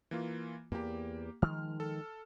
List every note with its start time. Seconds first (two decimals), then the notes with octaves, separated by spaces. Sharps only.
0.11 E3 A#3 F4
0.72 E2 A#3 G4
1.42 D#3 F3 G#3 F6
1.80 A4